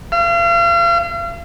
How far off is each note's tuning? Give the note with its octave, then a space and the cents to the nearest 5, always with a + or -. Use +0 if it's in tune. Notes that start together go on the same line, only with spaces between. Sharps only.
F5 -40